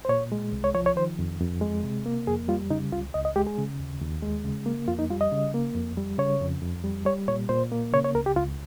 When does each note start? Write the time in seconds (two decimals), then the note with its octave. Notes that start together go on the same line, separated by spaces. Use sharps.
0.05 C5
0.09 A#2 C#5
0.32 G#3
0.52 C2
0.64 C#5
0.74 F3 C#5
0.86 C#5
0.96 D#3 C5
1.19 F2
1.40 F2
1.61 G#3
1.84 C3
2.06 A#3
2.27 F2 G#4
2.48 G3 F4
2.70 C#3 D#4
2.92 C#2 F4
3.14 C#2 D#5
3.25 D#5
3.36 G#3 G4
3.47 G#4
3.58 C#3
3.79 D#2
4.02 D#2
4.23 G#3
4.44 C#3
4.66 A#3
4.88 F2 F4
4.99 D#4
5.10 G3 F4
5.21 D#5
5.32 C#3
5.54 A#3
5.75 F2
5.97 G3
6.19 C#3 C#5
6.41 F2
6.62 F2
6.84 G3
7.05 G3 C#5
7.28 A#2 C#5
7.49 A#2 C5
7.72 A#3
7.93 C#3 C#5
8.04 C#5
8.15 C#2 A#4
8.26 G4
8.36 C#2 F4